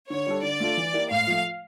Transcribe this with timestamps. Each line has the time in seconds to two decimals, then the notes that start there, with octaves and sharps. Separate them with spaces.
0.10 D3 C#5
0.27 G3 D4 A4
0.43 D3 D5
0.60 A3 D4 F4 A4
0.77 E3
0.93 A#3 E4 G4
1.11 A2 F5
1.27 F3 A3